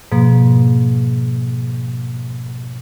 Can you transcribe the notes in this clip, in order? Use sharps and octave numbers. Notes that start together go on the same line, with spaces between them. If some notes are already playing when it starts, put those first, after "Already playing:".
G#2 B2 F3 A#3